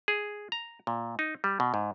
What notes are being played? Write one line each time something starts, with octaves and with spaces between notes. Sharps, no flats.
G#4
A#5
A#2
D#4
G3
B2
G#2